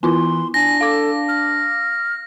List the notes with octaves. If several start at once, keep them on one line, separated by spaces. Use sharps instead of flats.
E3 B3 E4 F4 C6
D4 G#5 A#6
A4 F5 D6
F6